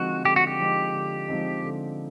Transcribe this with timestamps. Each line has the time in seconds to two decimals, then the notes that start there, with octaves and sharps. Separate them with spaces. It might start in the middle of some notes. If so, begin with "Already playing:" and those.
Already playing: D3 F3 G#3 C4 D#4 F#4
0.24 D3 G4
0.36 F#4
0.47 G4
0.59 F3 G#3 C4 D#4
0.93 D3
1.28 F3 G#3 C4 D#4
1.64 D3